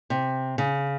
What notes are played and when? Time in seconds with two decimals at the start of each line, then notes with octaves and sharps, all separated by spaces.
0.10 C3
0.58 C#3